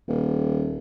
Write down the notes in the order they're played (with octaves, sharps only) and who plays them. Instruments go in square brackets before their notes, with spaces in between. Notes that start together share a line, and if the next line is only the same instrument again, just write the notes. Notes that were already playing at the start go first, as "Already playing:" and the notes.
[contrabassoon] D#1